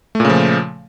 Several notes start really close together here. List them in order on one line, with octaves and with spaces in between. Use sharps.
A3 A#2 C#3 F3